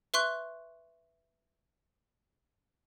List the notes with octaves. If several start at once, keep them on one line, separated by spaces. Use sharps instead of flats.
B4 E5 C6 C#6 F#6